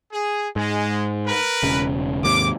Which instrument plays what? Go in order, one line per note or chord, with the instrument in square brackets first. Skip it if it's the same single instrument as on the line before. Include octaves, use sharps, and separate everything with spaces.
[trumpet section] G#4
[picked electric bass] G#2 [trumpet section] G#3
[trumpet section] A#4 B4
[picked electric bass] E1 C#3
[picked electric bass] D#2 G#2 C3 [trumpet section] D6